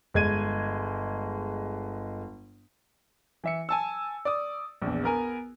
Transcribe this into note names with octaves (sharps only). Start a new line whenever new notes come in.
G1 G#3 G#6 D#7
E3 E5 C#7
G#5 A5 E6
D5 D#6
A#1 E2
B3 A#4 G#5